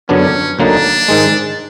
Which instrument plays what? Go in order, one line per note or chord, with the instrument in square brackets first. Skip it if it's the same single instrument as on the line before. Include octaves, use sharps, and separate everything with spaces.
[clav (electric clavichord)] F#2 D3 F#3 B3 D4 [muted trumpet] C#4
[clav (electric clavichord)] D2 D3 F#3 A#3 D#4 [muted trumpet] D4
[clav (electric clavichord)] G#2 D#3 G#3